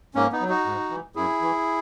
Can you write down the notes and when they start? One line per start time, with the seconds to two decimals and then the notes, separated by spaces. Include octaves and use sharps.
0.15 G#2 A#3 C#4
0.32 B3 D#4
0.41 F#3
0.49 D#4 F#4
0.65 G#2
0.90 E3
1.16 F#2 E4 G#4
1.41 E3